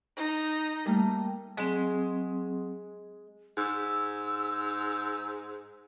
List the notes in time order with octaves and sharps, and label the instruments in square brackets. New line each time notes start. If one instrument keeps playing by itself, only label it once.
[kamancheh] D#4
[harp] G3 A3 A#3
[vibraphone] F#3 C4 [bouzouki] G#3
[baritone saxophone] G#2 [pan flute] E6